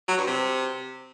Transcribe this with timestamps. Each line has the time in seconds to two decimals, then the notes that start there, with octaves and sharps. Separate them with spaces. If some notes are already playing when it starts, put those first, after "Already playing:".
0.08 F#3
0.18 G2
0.27 C3